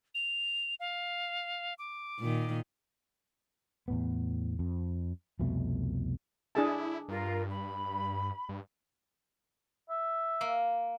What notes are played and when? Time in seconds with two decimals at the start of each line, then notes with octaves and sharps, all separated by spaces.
0.15 F7
0.80 F5
1.79 D6
2.20 A#2 D#3
3.88 E2 A2 B3
4.59 F2
5.39 C2 F2 B2 A3
6.55 D4 E4 G#4 A5
7.09 G2 F4 A#4
7.50 B5
8.49 G2
9.90 E5
10.41 A#3